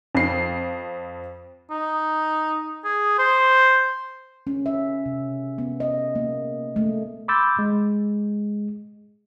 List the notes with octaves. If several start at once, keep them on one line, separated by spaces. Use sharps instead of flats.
F2 C7
D#4
G#4
C5
C#4
E5
C3
B3
D#5
A#3
A3
B5 C6 D6 E6 G6 A6
G#3